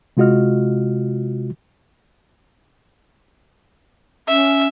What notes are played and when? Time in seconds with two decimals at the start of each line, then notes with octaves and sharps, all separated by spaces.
0.17 C3 G#3 F4 F#4 D#5 F6
4.28 C#4 E5